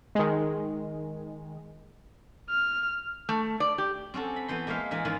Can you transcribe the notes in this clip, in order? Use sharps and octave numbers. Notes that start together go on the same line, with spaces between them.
D#3 G#3
F6
A3
D5
G4
C4 C#4 F#4 A4
B5
E3 B3 C5 C6
G#3 A#3 C#5 E5 F5
E3 G#3 A#4 E5
G#2 D#3 C#4 E4 F4